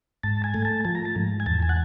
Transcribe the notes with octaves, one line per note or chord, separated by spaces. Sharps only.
G#2 A5
G#5
A3
A5
F3 A5
A#5
A5
G#2
G#5
E2 A5
G#5
F#5